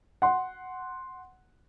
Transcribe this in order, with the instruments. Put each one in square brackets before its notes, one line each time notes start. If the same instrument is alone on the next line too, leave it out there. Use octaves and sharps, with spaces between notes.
[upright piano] F#5 C6